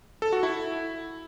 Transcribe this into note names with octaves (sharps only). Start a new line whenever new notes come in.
A4
F#4
E4